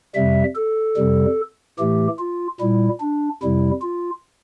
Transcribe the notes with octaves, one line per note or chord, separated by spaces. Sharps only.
F2 C3 G3 E5
A4
F2 C3 G3
A2 E3 A3 G4
F4
A#2 G3 E4
D4
F2 C3 G3 E4
F4